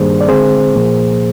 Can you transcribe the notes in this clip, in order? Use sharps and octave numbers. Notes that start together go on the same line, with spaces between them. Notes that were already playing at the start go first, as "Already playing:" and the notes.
Already playing: G2 D#3 G3 A#3 D4 G#4 C5
D5
D3 G#3 C4 G#4 C5
A#2 F3 A#3